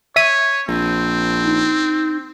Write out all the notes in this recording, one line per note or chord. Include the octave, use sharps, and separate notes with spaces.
C#5 E5 B6 D#7
A#1 C4
D#4